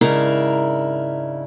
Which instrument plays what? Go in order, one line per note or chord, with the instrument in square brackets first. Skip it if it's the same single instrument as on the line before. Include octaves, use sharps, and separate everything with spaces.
[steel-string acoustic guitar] G#2 C#3 D4 E4 A#4 A#5